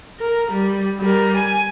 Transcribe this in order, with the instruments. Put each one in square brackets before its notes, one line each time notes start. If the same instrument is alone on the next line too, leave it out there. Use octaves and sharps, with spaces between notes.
[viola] A#4
G3
G3 A#4
G#5